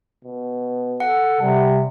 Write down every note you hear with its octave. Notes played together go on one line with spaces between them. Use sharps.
B2
A4 F#5
C3 G3